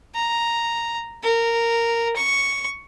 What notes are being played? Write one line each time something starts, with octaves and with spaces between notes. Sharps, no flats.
A#5
A#4
C#6